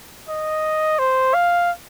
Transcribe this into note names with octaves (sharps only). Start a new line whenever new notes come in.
D#5
C5
F5